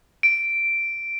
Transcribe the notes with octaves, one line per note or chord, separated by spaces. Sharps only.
D7